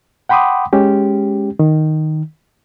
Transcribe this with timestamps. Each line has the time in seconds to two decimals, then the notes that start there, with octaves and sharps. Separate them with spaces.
0.29 F#5 G5 B5 C6 D6 D#6
0.73 G#3 C#4 G4
1.59 D#3